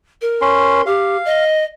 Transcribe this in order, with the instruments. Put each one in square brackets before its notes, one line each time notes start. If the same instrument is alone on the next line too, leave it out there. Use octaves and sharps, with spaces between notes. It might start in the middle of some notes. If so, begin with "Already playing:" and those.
[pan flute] A#4
[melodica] C#4 C6
[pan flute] G4 [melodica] F5
[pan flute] D#5